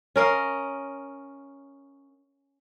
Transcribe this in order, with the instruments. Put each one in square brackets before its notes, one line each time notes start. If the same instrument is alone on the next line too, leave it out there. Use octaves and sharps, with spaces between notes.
[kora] C#4 A#4 D#5 F5